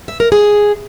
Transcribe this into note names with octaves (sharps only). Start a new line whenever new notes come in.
E5
A#4
G#4